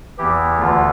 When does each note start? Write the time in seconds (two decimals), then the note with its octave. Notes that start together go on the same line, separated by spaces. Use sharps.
0.18 E2 E3 G4
0.60 D2 D3 F4